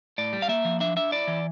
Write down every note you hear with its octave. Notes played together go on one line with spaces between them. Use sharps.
A2 D5
G3
F5
A#3 E5
F3
D4 E5
D4 E5
E4 D5
E3